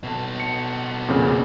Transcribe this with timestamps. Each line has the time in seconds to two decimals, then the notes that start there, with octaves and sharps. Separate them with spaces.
0.03 B2 A4
0.40 C#7
1.08 F2 A#2 C#3